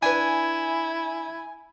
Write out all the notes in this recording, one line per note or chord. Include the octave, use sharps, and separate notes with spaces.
D4 E4 B4 G#5